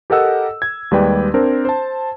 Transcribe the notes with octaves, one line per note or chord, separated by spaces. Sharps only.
G4 A4 A#4 D#5 F#5 E6
G#6
D#2 G3 G#3 B4 D5 G5
C4 D4 A#4 C5
C5 A5